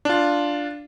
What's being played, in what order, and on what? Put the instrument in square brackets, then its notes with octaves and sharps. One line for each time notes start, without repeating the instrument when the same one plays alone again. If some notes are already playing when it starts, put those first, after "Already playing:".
[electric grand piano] D4 F4